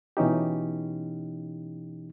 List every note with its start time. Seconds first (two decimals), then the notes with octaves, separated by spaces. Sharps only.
0.17 B2 E3 C#4 D#4 G4